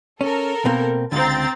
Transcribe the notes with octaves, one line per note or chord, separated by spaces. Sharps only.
C#4 A4 A#4
B2 A#3 C4
C#2 D3 C4 A#5 A6